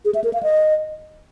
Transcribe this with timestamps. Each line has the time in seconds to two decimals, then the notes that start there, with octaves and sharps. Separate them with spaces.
0.05 G#4
0.15 E5
0.24 A#4
0.33 F5
0.43 D#5